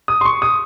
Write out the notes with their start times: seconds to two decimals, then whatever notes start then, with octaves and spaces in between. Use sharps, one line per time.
0.08 D#6
0.21 C6
0.25 C#6
0.42 D#6